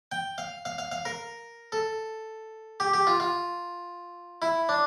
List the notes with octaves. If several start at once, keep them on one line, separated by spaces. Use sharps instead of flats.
G5
F5
F5
F5
F5
A#4
A4
G4
G4
F4
F4
E4
D4